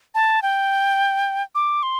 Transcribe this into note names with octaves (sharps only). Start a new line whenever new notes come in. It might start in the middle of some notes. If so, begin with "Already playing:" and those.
A5
G5
D6
C6